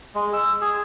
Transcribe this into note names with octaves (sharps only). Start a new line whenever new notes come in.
G#3
E6
G#4